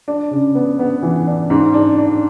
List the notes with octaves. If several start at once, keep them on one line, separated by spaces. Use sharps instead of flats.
D4
C#3
B3
B3
E3
D4
G#2
D4
D4